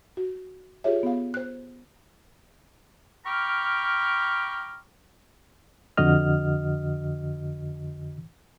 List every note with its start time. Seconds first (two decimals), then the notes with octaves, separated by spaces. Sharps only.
0.17 F#4
0.84 F4 G4 G#4 C#5 E5
1.03 B3 F5
1.34 C5 F#6
3.26 G5 A#5 B5 C#6 D6 F6
5.97 F2 D3 F#4 D#5 F6